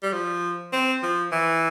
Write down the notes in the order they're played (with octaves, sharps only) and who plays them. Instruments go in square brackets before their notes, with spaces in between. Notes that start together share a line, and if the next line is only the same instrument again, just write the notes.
[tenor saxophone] G3
F3
C4
F3
E3